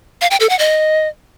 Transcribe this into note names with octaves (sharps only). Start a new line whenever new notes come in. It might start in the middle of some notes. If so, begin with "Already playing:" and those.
F5
G5
A4
F#5
D#5